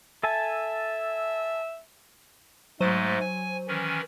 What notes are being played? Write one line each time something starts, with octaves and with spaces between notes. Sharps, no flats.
A4 E5 G#5 A5
G#2 F#3 G#3 A3 C5 D#7
G#5
D#3 E3 C#4